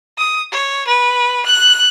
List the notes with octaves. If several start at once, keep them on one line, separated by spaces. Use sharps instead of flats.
D#6
C#5
B4
F#6